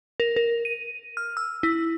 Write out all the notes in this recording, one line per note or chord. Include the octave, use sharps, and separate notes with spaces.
A#4
A#4
D#7
F6
E6
E4